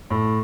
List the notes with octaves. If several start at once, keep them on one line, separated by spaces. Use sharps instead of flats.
A2